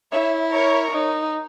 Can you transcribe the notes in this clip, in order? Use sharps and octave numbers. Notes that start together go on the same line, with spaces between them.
E4 C#5 E5
A#4 C#5
D#4